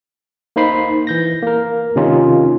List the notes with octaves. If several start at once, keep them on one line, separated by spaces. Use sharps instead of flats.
A#3 D#4 C5 B5 C7
E3 G6 A#6
A#3 A#4
C3 D#3 A#3 C#4 D#4 F4